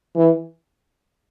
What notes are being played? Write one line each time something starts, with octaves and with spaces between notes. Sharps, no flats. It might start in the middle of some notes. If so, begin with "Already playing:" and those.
E3